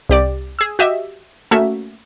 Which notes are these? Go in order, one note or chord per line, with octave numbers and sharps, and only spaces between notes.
C2 G4 D5
G#4 E6
F#4 G4 D#5 E5
A3 A#3 C#4 F#4 E5